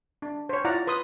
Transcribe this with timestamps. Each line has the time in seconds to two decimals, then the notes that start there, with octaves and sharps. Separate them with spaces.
0.22 D4
0.49 C5 C#5
0.65 E4 F4 D5 F#5 A#5
0.87 B4 C6 D#6